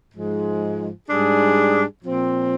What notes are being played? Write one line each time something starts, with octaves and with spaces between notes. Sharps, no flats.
G#2 F3 G#3
G#2 G3 D4 G#4
A#2 F3 C4